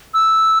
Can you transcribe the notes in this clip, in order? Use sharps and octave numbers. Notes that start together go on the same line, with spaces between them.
E6